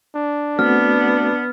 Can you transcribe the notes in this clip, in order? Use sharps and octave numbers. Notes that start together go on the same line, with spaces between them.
D4
A3 B3 C4 F#4 F6